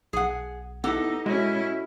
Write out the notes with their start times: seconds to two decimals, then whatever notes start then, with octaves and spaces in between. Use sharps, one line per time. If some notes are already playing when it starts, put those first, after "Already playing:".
0.13 B1 G#4 F#5
0.84 B3 D#4 E4 G4 A4 F#5
1.26 G#3 C#4 E4 F#4 D#5